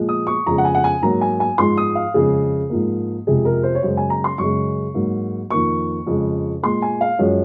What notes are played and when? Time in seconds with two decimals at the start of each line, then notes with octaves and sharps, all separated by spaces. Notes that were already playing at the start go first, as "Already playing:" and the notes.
Already playing: A#2 F3 G#3
0.09 D#6
0.27 C#6
0.46 F2 C#3 G#3 A#5
0.58 F#5
0.65 G#5
0.75 F#5
0.84 G#5
1.02 G#2 F#3 A#3 A#5
1.21 G#5
1.40 G#5
1.58 G#2 F3 G#3 C6
1.77 D#6
1.95 F5
2.14 F2 C#3 F3 G#3 G#4
2.70 G#2 F3 A#3
3.27 F2 C3 F3 G#3 G#4
3.45 A#4
3.63 C5
3.75 C#5
3.83 F#2 C#3 G#3 C5
3.97 G#5
4.10 A#5
4.24 C6
4.38 F#2 C#3 G#3 C#6
4.94 G#2 F#3 A#3
5.50 F2 D#3 A#3 C#6
6.07 F2 C#3 G#3
6.63 A#2 G#3 C6
6.82 G#5
7.01 F5
7.19 F#2 F3 G#3 C#5